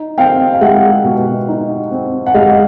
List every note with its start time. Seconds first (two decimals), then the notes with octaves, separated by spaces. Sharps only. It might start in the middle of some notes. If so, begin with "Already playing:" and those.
Already playing: D#4
0.18 C4 F5 G5
0.54 F5
0.61 G#3 E5 F#5
1.04 B2
1.48 D#4
1.91 C4
2.26 F#5
2.34 G#3 D#5 F5